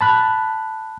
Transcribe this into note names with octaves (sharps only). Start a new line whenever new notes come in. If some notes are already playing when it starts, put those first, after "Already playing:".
A5 B5 F#6